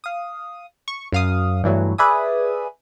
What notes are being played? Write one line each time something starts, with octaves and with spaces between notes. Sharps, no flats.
F5 D#6
C#6
F#2 F5 D#6
G2 E3 F#3 A3
G#4 B4 D5 E5 G#5 D#6